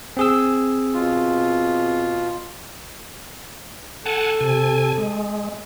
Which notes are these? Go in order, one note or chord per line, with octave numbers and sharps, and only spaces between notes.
C4 G#4 E6
B2 F4
A4 F#5 G#5 A5
C3 G#5
G#3